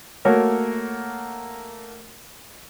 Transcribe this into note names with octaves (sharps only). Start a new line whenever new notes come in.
A3 A#3 F#4 A#4 C#5